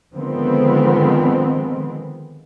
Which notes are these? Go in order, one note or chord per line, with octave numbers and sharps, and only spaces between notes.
D3 D#3 F3 G#3 B3 C4